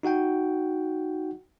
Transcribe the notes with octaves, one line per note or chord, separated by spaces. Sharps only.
D#4 F#4 F#5 G5